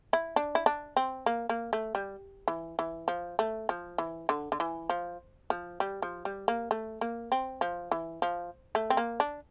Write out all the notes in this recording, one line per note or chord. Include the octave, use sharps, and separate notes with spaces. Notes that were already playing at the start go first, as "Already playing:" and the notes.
E4
D4
E4
D4
C4
A#3
A#3
A3
G3
E3
E3
F3
A3
F3
E3
D3
D3
E3
F3
F3
G3
F3
G3
A#3
A3
A#3
C4
F3
E3
F3
A3
C4
A#3
D4